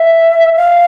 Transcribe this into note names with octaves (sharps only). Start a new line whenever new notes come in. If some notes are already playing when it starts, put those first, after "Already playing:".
Already playing: E5
F5